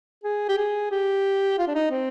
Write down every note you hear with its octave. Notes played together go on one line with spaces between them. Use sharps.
G#4
G4
G#4
G4
F4
D4
D#4
C4